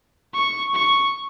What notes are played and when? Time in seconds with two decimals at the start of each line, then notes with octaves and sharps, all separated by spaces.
0.34 C#6
0.75 C#6